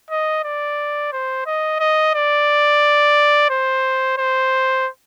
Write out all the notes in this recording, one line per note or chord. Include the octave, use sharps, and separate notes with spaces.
D#5
D5
C5
D#5
D#5
D5
C5
C5